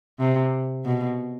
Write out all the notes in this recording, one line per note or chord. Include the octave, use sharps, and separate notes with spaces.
C3
B2